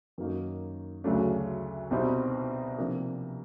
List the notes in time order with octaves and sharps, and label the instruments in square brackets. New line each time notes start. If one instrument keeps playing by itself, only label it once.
[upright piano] F#2 D#3 F#3 A#3 D#4
D2 C#3 F#3 A3 D4
C2 B2 G3 C4 D#4
C3 F3 A#3 D4